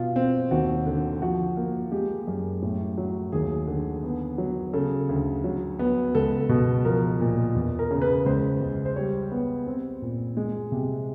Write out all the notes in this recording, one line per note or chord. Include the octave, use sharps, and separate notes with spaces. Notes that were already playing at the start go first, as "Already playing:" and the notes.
Already playing: B2 F4
C4
D#2 F#4
D3
F3 F#4
A#3
G#3 G4
F#2
A2
F#3
D#2 G#4
D3
B3
F#3
C#3 A4
D2
F#3
B3
C#2 A4
B2
F3 A#4
A#2
E2
A#4
C#3
B4
C#2 C5
C#2
C5
G3 C#5
B3
C4
A#2
G#3
C3